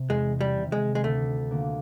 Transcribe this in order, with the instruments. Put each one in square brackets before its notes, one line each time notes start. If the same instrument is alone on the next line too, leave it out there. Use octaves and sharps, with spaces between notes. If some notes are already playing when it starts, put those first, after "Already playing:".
Already playing: [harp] C3
[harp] E2 [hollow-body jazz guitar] G#3
[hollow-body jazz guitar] G3
[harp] C3 D#3
[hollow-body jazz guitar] G#3
G#3
[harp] D2 [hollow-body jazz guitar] A3
[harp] D3 F3 A#3